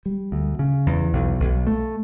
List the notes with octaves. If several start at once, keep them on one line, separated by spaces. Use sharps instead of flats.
G3
D2
C#3
E2
B1
B1
A3